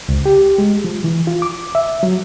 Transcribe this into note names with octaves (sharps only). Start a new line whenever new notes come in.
C#2
G4
G#3
F3
E3
F4
D6
E5
F#3